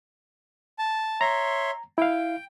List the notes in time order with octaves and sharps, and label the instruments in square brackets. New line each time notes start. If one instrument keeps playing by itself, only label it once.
[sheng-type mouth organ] A5
[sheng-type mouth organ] C#5 E5 C6 [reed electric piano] A#5
[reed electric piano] E4 F5 [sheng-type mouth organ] G5